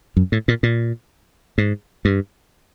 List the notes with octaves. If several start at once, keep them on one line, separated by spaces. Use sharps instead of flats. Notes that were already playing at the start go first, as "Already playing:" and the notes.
F#2
A2
A#2
A#2
G#2
G2